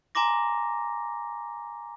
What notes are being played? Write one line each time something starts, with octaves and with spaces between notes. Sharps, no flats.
G#5 A#5 C6 D6 A#6